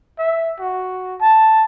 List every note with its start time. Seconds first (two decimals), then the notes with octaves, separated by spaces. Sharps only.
0.19 E5
0.60 F#4
1.21 A5